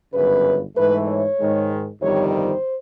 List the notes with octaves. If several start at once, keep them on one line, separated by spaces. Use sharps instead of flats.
G1 F#2 C#3 B4
G#2 E3 A3 B4
C#5
G#2 D#3 G#3
G1 F2 C3 D#3 G3 C#5
C5